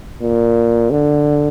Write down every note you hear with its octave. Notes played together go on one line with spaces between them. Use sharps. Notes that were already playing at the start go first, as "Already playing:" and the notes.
A#2
D3